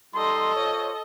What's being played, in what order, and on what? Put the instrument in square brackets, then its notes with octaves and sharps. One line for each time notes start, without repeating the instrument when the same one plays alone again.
[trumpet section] G3 D#4 C6 [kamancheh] A4 D#5
[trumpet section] F4 C5 C#5